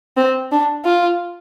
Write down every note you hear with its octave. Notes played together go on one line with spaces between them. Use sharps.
C4
D4
F4